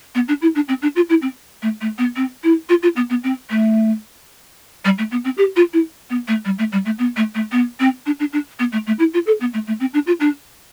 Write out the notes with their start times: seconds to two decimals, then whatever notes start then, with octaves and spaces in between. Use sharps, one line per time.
0.14 B3
0.28 D4
0.41 E4
0.55 D4
0.68 C4
0.82 D4
0.95 F4
1.09 E4
1.21 C4
1.62 A3
1.81 A3
1.98 B3
2.16 C4
2.43 E4
2.69 F4
2.82 F4
2.96 B3
3.09 B3
3.23 C4
3.50 A3
4.84 G3
4.98 A3
5.11 B3
5.24 C4
5.37 G4
5.56 F4
5.73 E4
6.09 B3
6.27 A3
6.45 G3
6.58 A3
6.72 G3
6.85 A3
6.98 B3
7.16 A3
7.34 A3
7.51 B3
7.79 C4
8.06 D4
8.19 D4
8.32 D4
8.59 B3
8.72 A3
8.86 A3
8.99 E4
9.13 F4
9.26 A4
9.40 B3
9.53 A3
9.67 A3
9.80 C4
9.93 D4
10.06 F4
10.20 D4